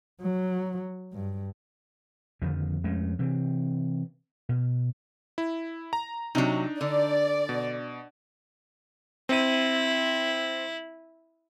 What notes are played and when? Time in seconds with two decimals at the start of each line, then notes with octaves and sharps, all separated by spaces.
0.22 F#3
1.13 G2
2.42 F2 D3 D#3 F3
2.84 F2 G#3 A3 C#4
3.19 C3 E3 C4
4.49 B2
5.38 E4
5.93 A#5
6.35 C3 F#3 D4 D#4
6.81 D3 D5
7.49 B2
9.29 C4 E4 D#7